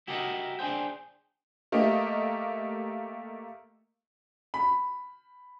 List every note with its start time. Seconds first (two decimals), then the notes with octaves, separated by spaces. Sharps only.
0.07 E4 F#4 G4 A4 A#4 D#5
0.59 D4 G#4 C5 G5
1.72 A3 A#3 G4 D#5
4.54 B5